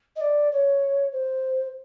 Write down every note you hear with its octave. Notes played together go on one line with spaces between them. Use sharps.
D#5
D5
C#5
C5